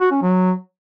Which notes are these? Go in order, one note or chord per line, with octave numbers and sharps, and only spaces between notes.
F#4
C#4
F#3